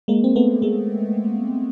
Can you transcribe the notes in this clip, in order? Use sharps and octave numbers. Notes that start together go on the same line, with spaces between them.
G#3 A#3
C4
A3 B3
G#3 A#3